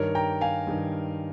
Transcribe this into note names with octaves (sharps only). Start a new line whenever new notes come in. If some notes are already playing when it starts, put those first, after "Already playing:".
Already playing: G2 D#3 A#4 C#5
G5 A#5
F5 G#5
G2 D#3